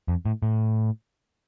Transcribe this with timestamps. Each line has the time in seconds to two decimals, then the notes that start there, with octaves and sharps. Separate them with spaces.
0.08 F2
0.25 A2
0.43 A2